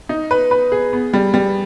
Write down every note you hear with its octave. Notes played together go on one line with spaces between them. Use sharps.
D#4
B4
B4
G#4
B3
G3
G3